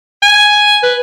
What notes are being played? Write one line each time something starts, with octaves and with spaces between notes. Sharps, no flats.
G#5
B4